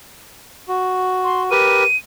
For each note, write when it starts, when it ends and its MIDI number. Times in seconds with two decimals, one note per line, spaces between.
0.68 1.50 66
1.24 1.43 84
1.51 1.83 67
1.51 1.83 70
1.51 1.83 71
1.51 1.97 99